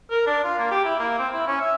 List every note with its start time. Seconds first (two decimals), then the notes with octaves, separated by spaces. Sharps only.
0.11 A#4
0.27 D4
0.44 F4
0.59 A#3
0.71 G4
0.85 E4
0.99 A#3
1.19 C4
1.33 E4
1.47 C#4
1.61 E5